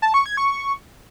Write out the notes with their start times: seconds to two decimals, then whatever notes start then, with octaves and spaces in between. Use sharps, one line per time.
0.02 A5
0.14 C#6
0.26 G#6
0.37 C#6